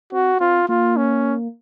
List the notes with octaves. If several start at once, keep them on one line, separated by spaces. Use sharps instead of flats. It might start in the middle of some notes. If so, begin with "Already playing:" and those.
C4 F#4
C4 F4
A#3 F4
C#4